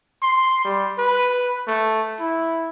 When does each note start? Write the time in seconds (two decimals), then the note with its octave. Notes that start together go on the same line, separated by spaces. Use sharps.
0.22 C6
0.65 G3
0.98 B4
1.67 A3
2.20 E4